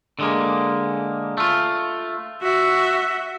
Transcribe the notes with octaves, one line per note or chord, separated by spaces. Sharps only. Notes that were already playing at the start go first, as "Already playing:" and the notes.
D3 G#3 A#3
A3 F4
F#4 E5